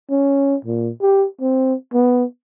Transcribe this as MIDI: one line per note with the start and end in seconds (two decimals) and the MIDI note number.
0.11 0.55 61
0.65 0.91 46
1.01 1.26 67
1.41 1.74 60
1.94 2.24 59